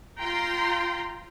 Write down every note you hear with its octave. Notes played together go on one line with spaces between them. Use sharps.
F4 G5 A#5 C6